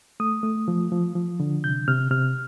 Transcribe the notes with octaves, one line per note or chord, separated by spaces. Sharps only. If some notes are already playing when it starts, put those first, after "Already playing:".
A3 D#6
A3
F3
F3
F3
D3
C3 G6
C3 F6
C3 F6